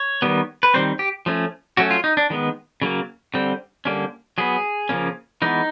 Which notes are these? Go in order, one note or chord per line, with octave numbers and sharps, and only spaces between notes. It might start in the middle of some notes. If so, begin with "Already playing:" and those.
Already playing: C#5
D#3 G3 B3
B4
D#3 G3 C4 C5
G4
F3 A3 C#4
F#3 A3 C#4 F#4
F4
D#4
D4
D#3 G#3 B3
C#3 F#3 A#3
D3 G3 C4
D3 G3 A#3 C#4
F#3 B3 G#4
C#3 F3 A#3 C#4
E3 G#3 B3 D#4